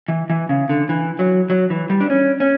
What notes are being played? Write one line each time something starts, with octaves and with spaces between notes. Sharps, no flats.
E3
E3
C#3
D3
E3
F#3
F#3
E3
G3
D4
C#4
C#4